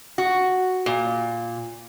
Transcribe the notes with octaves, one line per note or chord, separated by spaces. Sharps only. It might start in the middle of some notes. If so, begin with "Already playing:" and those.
F#4
A#2